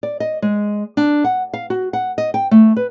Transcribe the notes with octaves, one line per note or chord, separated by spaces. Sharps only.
D5
D#5
G#3
D4
F#5
F5
F#4
F#5
D#5
G5
A3
B4